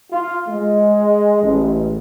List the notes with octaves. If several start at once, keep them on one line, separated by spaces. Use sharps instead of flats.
F4
G#3
A1